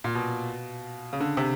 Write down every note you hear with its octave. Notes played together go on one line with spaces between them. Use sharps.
A#2
B2
C#3
D3
C3